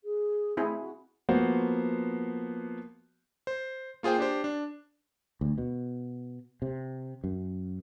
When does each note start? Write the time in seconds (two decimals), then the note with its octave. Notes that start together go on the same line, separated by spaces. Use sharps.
0.04 G#4
0.57 A3 C4 E4 G#4
0.80 F#4
1.29 F3 A#3 B3 F#4 C5
3.47 C5
4.03 A#3 F4 G#4 C5 G5
4.19 D4 G4 C5
4.44 D4
5.41 D2
5.58 B2
6.62 C3
7.24 F#2